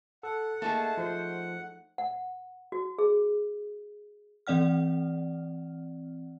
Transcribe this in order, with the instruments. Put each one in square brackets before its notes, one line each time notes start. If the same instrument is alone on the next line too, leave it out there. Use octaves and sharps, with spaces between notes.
[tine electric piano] A4 [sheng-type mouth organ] F#5
[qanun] A3 D#4 G#4 [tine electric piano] A#3 [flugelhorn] A5
[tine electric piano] F3 [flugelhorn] C5
[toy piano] F#5
F#4
G#4
[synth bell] E3 C4 D5 F#5 F6